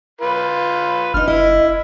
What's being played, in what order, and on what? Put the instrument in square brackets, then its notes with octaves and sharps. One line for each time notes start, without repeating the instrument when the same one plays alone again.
[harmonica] F4 B4
[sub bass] F#1 [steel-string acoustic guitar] D4 D#4 [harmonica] F6
[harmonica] E4 [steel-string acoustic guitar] D#5